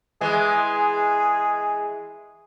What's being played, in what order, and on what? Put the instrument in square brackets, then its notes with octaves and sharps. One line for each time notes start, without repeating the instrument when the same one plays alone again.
[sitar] E3 G#3 [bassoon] G#4